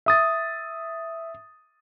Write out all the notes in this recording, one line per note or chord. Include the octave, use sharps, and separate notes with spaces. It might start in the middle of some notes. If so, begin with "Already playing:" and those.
E5 D#6 A6